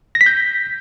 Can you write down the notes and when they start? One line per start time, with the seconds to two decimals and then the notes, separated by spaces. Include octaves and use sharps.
0.15 A#6
0.21 B6
0.26 G6